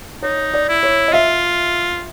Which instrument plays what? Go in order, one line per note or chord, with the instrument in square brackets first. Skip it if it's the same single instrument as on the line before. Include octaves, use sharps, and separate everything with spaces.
[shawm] D#4 [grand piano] C#5
[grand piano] D5
[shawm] E4
[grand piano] C#5
D#5
[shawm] F4 [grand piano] E5